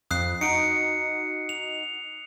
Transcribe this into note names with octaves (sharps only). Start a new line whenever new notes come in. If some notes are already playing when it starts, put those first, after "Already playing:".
F2 D#6 F#6 C7
D#4 F#4 C#7 D7
F7